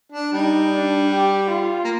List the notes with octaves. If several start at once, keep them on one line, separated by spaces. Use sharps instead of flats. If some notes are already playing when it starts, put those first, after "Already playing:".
D4
G3 D#4
D4
G4
F4
A#3